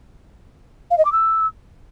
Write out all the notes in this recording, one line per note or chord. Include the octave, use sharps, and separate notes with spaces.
F5
D#5
D6
E6